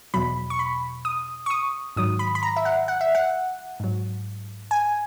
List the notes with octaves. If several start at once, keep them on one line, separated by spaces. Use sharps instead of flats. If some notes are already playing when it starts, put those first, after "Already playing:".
E2 B2 F#3 B5
C#6
B5
D#6
C#6
D#6
G#2 D#3 F#3 D#6
B5
B5
A#5
E5
F#5
F#5
E5
F#5
G#2 F#3
G#5